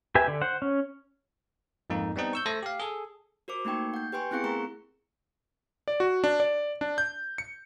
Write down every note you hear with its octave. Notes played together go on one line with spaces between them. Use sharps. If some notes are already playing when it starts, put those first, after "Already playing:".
G4 B4 E5 G#5
D3
C5 F#5
C#4
F2 G#2 A#3 D#4
G3 B3 C4 D4 D#4
C#6 E6 G6
A3 A4 C5 A#6
G4 F5
G#4 A4
F#4 A#4 C5 D6
A3 A#3 D#4 G5 C#6
F#5 G6
G4 B4 G5 G#5 C6 C#6
B3 C4 E4 G#4 F#5 C#7
A3 G#4 A#4 A#5 C#6
D5
F#4
D4
D5
D4
G6
C#7